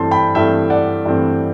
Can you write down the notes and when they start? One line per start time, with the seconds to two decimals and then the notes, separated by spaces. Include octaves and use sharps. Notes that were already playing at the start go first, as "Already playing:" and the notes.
Already playing: G2 E3 A3 C4 A5 C6
0.11 G5 B5
0.35 G2 E3 A3 C4 E5 G5
0.70 D5 F#5
1.05 G2 E3 A3 C4